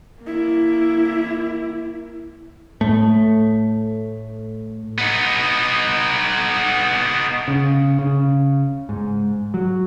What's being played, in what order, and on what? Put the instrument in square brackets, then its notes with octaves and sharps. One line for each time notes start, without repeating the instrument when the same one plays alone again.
[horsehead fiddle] A#3 E4
[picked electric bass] A2 A3
[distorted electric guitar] B3 D#4
[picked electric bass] C#3
C#3
G#2
F#3